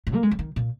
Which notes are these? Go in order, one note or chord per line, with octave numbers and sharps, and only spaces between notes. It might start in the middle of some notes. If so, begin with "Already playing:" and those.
G#2
A#3
G#3
F3
D#3
A#2